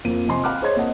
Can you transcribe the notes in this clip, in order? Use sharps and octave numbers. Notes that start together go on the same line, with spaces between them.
F2 A#3 D#7
C3 F3 D#5 G#5 C6
F5 G5 B5 D6 F6 F#6
G#4 C5 C#5 D#5 C6 G#6
A#3 C4 D#5 F#5 A5